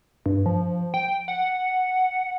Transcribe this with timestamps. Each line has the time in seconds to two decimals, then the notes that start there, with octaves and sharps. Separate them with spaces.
0.26 G2
0.46 F3
0.94 G5
1.28 F#5